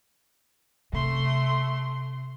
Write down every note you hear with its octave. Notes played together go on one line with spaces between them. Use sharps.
C3 A3 C6